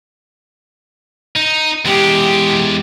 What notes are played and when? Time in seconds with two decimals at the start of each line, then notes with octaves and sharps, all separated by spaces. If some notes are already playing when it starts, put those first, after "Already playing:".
1.36 D#4
1.85 E2 G#3 G4